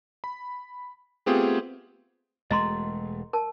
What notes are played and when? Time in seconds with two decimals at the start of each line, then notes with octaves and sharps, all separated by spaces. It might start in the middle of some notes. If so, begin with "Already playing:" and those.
0.24 B5
1.26 A3 B3 C4 F4 G4 G#4
2.51 E1 G#3 A3 D#5 A#5 C6
3.33 A#4 A5